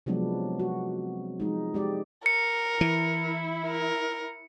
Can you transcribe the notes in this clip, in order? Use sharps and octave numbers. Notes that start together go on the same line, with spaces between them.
C3 F3 F#3 G#3 B3 D4
F#4
F3 G#3 D#4
G#3 G4 D5
A#4 C#7
E3 E4
A#4